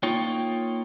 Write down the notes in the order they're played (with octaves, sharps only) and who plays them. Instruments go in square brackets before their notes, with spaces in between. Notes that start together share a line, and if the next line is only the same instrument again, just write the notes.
[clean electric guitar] A#3 D#4 F4 C#5 G5